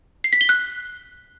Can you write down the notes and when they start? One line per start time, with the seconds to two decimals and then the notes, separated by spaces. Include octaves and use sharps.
0.24 C7
0.33 B6
0.41 G7
0.49 F#6